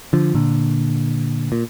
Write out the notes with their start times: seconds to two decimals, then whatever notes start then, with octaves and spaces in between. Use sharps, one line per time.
0.13 D3 F3
0.35 A#2 D3
1.52 A#2